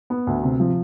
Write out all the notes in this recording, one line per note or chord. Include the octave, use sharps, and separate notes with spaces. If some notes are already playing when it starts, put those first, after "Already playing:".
B3
D2
C3
F3